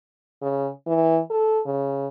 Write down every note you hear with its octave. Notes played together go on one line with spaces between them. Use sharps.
C#3
E3
A4
C#3